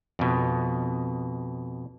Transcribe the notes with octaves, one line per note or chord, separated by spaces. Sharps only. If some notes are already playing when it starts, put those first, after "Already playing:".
F2 B2